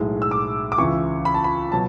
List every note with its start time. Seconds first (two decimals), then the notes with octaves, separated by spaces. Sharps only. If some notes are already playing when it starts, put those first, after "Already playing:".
Already playing: B1 A2 G#3
0.22 E6
0.31 D6
0.72 D6
0.78 C#2 C#3 E3 C#6
1.25 B5
1.34 A5
1.44 B5
1.72 B2 F#3 A5